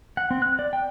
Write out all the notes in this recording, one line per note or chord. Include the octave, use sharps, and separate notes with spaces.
F#5
C4
F#6
D5
G5